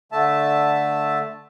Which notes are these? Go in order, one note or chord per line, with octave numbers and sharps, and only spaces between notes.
D3 A3 E5 A5